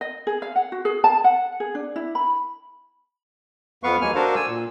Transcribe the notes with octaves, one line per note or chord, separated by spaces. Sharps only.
D#5
G#4
F5
F#5
F#4
G#4
A5
F#5
G#4
D4
E4
B5
F2 B3 B4 F5 C#6
D#2 F#3 G#3 A#3 G#5 F6
D4 F#4 A4 A#4 C5 F5
G#5 E6
A#2